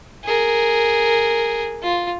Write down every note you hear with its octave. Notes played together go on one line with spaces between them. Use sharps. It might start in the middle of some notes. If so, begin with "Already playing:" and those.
G#4 A#4
F4